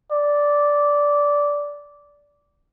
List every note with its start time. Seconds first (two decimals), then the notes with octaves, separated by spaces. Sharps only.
0.12 D5